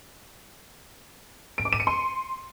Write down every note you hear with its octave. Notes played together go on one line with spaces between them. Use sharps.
D7
D6
D#7
C#7
C6